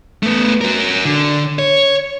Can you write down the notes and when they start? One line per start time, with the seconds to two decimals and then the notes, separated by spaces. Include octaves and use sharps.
0.23 A3 B3
0.61 F#4 A#4
1.05 D3
1.59 C#5